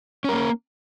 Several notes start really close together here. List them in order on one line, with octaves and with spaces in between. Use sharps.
C#4 A#4 A#3